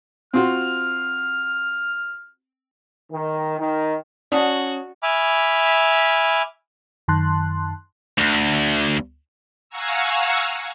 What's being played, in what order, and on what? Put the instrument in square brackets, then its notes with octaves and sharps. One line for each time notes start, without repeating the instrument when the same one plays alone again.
[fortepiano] C4 F4 F#4 [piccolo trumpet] F6
[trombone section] D#3
D#3
[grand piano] C#4 A5 D#6 [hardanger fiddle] F#4 [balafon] D5 F#5
[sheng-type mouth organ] E5 G#5 B5 D6 F6
[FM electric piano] F#2 D#3 A5 C6 F#6
[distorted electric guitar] D2
[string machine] F5 F#5 G#5 A#5 C#6 E6